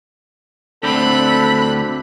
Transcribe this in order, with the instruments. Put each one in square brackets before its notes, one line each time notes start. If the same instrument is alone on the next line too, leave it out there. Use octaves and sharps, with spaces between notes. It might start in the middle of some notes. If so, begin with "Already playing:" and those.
[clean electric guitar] D2 D3 C4 [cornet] A4 [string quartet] B5 F#6